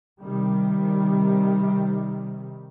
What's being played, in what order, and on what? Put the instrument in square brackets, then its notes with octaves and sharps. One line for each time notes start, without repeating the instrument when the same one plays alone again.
[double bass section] C3 D#3 G3